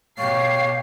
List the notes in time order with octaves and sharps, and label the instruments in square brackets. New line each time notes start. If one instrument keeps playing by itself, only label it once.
[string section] B2 G4 C7 [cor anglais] C#5 [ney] F5